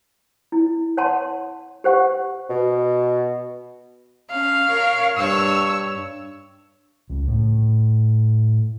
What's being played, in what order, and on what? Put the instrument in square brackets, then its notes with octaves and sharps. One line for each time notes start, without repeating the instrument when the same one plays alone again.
[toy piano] E4
C#5 F#5 A5 C6
G4 C5 F#5 C#6
[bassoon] B2
[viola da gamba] C#4 [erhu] F5
[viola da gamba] A#4 C#5
[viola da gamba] G2 C#5 [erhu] E6
[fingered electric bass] C#2
A2